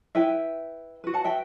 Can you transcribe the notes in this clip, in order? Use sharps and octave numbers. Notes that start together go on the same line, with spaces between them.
E4 B4 E5 G5
F#4 B4
F#5 A5
E5 G5